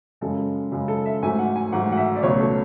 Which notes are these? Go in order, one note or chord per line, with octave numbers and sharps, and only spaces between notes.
F#2 C#3 G#3 A4
F#2 C#3 G#3
A4
E5
G#2 F#3 A3 G#5
F#5
G#5
G#2 F#3 A3 F#5
F#5
E5
D5
C#2 B2 F#3 A3 C#5
A4